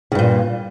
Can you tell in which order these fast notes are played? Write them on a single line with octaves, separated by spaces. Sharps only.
C#3 G2 A#2